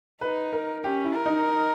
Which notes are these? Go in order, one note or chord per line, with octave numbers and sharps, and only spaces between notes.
D#4 B4
A#4
C#4 G4
E4
A#4
D#4